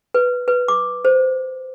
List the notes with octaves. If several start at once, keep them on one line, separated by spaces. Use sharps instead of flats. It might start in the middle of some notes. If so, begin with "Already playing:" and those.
B4
B4
D6
C5